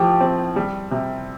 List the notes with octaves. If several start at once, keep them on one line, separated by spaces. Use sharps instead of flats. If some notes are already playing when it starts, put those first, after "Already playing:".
Already playing: A2 F3 G4
C4
G3
C3